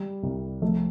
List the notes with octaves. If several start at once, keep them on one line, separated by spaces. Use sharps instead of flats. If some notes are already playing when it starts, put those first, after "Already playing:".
Already playing: G3
C2
F3 A3